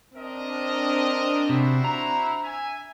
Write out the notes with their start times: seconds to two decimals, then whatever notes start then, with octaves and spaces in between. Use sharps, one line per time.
0.16 C4 D4 A#4 D#5
1.49 C3 E4 F#4 C5
1.85 A#5
2.42 E5 G#5